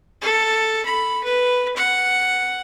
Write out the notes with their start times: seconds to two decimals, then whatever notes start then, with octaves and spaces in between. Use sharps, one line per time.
0.22 A4
0.85 B5
1.24 B4
1.77 F#5